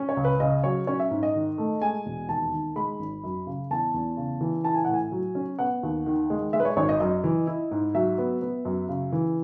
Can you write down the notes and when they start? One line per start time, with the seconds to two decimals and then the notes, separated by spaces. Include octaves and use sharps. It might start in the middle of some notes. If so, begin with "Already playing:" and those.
Already playing: C#4
0.09 C#5
0.17 C#2
0.25 B4
0.40 C#3 D#5
0.64 F#3 C#5
0.87 C#4 C#5
1.00 E5
1.11 G#2
1.23 D#5
1.35 D#3
1.58 A3
1.82 G#3 G#5
2.06 E1
2.29 D#2 A5
2.53 D#3
2.76 G#3 B5
2.99 G#1
3.24 F#2
3.47 C#3
3.70 E2 A5
3.94 E2
4.17 C#3
4.41 E3
4.64 E4 A5
4.75 G#5
4.85 A2 F#5
4.94 G#5
5.12 F#3
5.35 C#4
5.59 B3 F#5
5.83 D#2
6.06 D#3
6.30 G#3
6.53 G#3 E5
6.60 B4
6.65 C#5
6.77 G#1 C#5
6.89 D#5
7.00 F#2 D#5
7.24 E3
7.47 E4
7.71 G#2
7.95 F#3 E5
8.18 B3
8.42 B3
8.65 F#2
8.89 C#3
9.12 E3